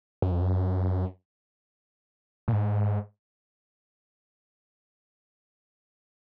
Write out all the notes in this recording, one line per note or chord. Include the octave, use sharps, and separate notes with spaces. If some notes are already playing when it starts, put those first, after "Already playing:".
F#2
F2
F#2
A#2
G#2